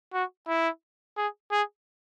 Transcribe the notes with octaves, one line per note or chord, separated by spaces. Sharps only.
F#4
E4
G#4
G#4